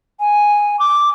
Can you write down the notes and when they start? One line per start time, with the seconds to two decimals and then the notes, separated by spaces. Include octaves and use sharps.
0.20 G#5
0.79 D6